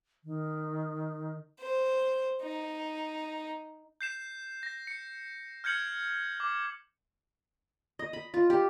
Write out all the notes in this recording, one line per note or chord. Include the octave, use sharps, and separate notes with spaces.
D#3
C5
D#4
G6 C7 E7
A#6
C#7
F6 G6 G#6 C#7 F#7
D6
D#5
B5
F4
G4